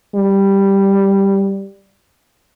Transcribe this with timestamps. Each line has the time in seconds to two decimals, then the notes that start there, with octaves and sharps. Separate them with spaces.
0.15 G3